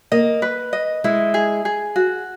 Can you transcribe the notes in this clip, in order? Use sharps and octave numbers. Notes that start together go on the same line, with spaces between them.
A#3 D#5
B4
D#5
G#3 E4
G#4
G#4
F#4